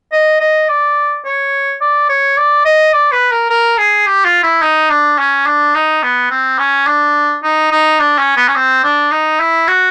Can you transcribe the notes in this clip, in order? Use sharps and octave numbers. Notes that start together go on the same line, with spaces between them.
D#5
D#5
D5
C#5
D5
C#5
D5
D#5
D5
B4
A#4
A#4
G#4
G4
F4
E4
D#4
D4
C#4
D4
D#4
B3
C4
C#4
D4
D#4
D#4
D4
C#4
B3
C#4
C4
D4
D#4
E4
F#4